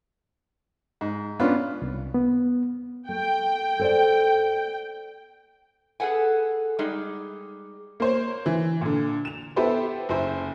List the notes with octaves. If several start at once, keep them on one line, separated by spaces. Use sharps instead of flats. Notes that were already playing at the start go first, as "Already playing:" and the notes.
G#2
B3 C#4 D4 F4
C2
B3
A3 G5
A4 C5 D5
G#4 A4 B4 F#5 G#5
G3 G#3 D#4 G4 G#4
A#3 C5 C#5
E3
A#2 D3
E7 F7
B3 E4 G4 A4 B4 C5
F#1 E4 C5